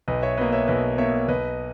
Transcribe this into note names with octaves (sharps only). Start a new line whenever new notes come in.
B1 B4 D#5
C#5 E5
B2 A#3 B4 D#5
C#5 E5
B1 B4 D#5
B2 A#3 C#5 E5
B1 B4 D#5